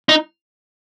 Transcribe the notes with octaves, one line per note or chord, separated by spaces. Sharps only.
D#4